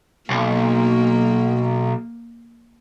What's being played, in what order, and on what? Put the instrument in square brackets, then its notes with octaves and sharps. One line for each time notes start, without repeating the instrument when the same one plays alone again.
[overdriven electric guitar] B1 [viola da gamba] A#3